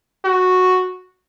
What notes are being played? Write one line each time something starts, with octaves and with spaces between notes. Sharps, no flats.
F#4